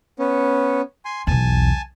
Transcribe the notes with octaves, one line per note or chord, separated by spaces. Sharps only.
B3 C#4
G#5 C6
B1 E2 G#5 A5